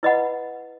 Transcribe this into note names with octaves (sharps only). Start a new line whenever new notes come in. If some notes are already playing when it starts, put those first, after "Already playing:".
E4 B4 D#5 F#5 B5